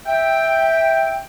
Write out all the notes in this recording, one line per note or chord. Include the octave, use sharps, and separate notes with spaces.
E5 G5